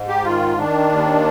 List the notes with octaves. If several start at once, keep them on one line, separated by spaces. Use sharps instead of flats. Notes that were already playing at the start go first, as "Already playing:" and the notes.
Already playing: G#2
G4
D#3 F4
D#3 D4
D#2